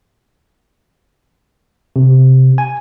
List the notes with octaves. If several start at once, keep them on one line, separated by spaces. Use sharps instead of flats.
C3
G#5